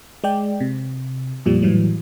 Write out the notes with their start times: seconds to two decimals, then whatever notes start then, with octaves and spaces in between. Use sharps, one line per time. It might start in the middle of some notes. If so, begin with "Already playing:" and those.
0.24 G#3 D5 G5
0.60 C3
1.45 F2 A#2 F3 G3
1.62 A2 E3 F#3 G3